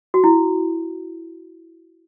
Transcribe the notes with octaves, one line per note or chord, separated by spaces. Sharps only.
F#4
E4